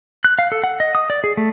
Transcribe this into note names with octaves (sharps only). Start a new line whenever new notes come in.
F#6
F5
A4
F#5
D#5
D#6
D5
G#4
A3